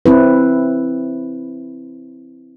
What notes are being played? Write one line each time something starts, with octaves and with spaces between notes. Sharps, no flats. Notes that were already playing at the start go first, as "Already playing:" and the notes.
C4 E4 B4